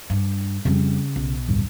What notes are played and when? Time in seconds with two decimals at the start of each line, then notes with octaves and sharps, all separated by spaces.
0.10 G2
0.65 F2 C#3 G3
1.16 B1
1.48 D1 G2